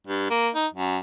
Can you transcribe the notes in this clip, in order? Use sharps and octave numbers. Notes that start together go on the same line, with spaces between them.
G2
A#3
D#4
F#2